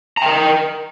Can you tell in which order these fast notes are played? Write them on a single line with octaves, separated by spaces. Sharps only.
A#5 G5 A#4